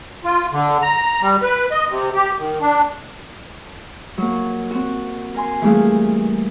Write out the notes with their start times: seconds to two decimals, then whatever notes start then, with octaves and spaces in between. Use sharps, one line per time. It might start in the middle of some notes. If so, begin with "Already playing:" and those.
0.24 F4
0.52 D3
0.82 A#5
1.22 G3
1.42 B4
1.71 D#5
1.90 C3
2.14 G4
2.38 D#3
2.61 D4
4.18 F#3 A#3
4.70 C4 F#4
5.35 A#4 G#5 C6
5.62 E3 G3 A3 A#3 G#4 F5